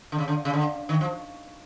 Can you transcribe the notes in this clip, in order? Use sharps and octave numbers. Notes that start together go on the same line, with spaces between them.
D3
C#3
D3
C#3
D3
D#3
F3